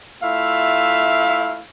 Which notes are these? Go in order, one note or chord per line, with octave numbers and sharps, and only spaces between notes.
A3 E4 F4 E5 F5